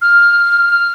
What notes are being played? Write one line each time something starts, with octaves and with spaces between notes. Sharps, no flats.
F6
F6